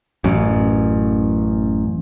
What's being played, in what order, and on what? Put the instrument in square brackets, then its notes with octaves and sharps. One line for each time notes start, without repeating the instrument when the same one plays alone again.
[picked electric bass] A1 F#2